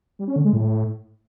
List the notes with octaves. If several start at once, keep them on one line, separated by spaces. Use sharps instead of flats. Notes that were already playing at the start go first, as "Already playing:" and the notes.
G3
C#4
D3
G#3
A2